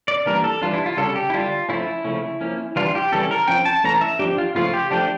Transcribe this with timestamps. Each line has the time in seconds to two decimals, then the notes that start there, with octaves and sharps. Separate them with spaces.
0.08 D5
0.26 E3 G3 A#3 D4 A#4
0.44 A4
0.61 E3 G3 D4 F4
0.73 E4
0.86 F4
0.97 C#3 G3 C#4 A4
1.15 G4
1.30 E4
1.33 D3 G3 D4 F4
1.69 F3 A3 C#4 E4
2.04 C#3 F3 A3 C#4
2.41 F3 A#3 C#4
2.76 E3 G3 D4 F4
2.95 G4
3.12 C#3 E3 G3 C#4 A4
3.31 A#4
3.48 F3 C#4 G5
3.65 A5
3.84 E3 A3 C#4 A#5
4.01 E5
4.19 F3 A3 D4 G4
4.38 F4
4.55 C#3 F3 A3 F4
4.74 G4
4.91 F3 A3 D4 G4